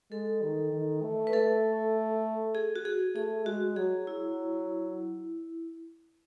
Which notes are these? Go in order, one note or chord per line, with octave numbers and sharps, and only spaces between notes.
G#3 A4
D#3
D#3
A3
B4
A3 A4
G#4
F#4
G#4
A3 G#4
G#3 F#4
F#3 G#4
E4